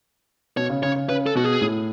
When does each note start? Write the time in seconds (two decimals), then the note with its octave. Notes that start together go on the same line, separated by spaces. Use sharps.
0.57 B2 C#5
0.70 C#3
0.83 C#3 C#5
0.95 C#3
1.09 C#3 B4
1.26 A4
1.35 B2 F#4
1.44 G#4
1.61 A2